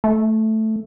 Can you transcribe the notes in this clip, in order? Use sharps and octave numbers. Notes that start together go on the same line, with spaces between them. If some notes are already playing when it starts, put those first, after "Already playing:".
A3